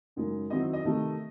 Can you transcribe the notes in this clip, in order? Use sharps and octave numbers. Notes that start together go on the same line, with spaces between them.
F#2 C#3 G#3 D#4
D#3 F#3 C4 E4 D#5
D#5
C3 D#3 A3